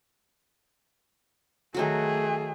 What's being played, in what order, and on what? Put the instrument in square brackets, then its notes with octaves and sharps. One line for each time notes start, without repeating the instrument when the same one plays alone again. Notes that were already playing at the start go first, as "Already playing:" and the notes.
[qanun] D#3 F#3 F#4 [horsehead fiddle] A3 G#4